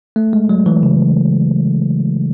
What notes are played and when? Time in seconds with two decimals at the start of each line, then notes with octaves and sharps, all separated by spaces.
0.16 A3
0.33 G#3
0.49 F#3
0.66 E3
0.83 C#3